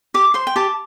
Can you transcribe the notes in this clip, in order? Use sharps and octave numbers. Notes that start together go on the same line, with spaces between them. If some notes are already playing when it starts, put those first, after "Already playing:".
G4 D6
C5 C6
G5
G4 A5